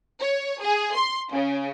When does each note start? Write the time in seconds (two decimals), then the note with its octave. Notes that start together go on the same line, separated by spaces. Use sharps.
0.20 C#5
0.61 G#4
0.95 C6
1.32 C#3